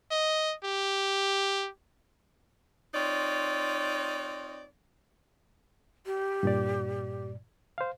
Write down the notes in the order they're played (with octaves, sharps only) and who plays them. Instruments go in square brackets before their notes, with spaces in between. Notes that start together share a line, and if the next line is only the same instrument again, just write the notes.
[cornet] D#5
G4
[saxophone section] C4 D#4 F4 C#5 D5
[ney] G4
[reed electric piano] G2 A#2 D5
C5 F5